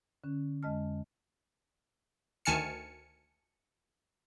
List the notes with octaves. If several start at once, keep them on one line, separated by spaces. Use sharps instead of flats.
D3 C#4
F2 G#3 D#5 A5 F6
D2 D#3 G#5 A5 F6 C#7